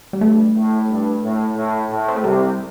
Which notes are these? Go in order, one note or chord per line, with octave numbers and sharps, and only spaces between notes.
G3
G2 A3
A2
G2
A2
A2
A2
C4
A3
C2 C3 G3